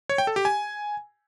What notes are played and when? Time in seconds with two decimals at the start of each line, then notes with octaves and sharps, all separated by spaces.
0.09 C#5
0.18 G5
0.27 A4
0.36 G4
0.45 G#5